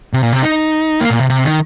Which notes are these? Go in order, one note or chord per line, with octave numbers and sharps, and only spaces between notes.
C3
A#2
C3
D#4
A#3
A#2
C3
C3
D#3